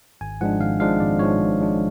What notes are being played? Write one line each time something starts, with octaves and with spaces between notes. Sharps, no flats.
G#1 G#5
G#2 F3 G#3 D4 F#5
G#1 F5
G#2 F3 G#3 D4 F5
G#1 D5
G#2 F3 G#3 D4 C#5
G#1
G#2 F3 G#3 D4